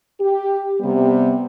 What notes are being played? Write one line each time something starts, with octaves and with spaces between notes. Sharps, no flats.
G4
C3 G3 B3